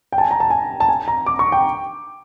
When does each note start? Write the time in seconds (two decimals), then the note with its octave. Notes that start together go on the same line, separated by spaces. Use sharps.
0.12 G5
0.18 A5
0.21 G#5
0.31 A#5
0.40 A5
0.50 G#5
0.80 A5
0.89 G#5
1.08 A#5
1.26 D6
1.39 C#6
1.52 G5